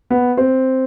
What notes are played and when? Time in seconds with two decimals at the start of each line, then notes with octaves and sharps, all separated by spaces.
0.10 B3
0.37 C4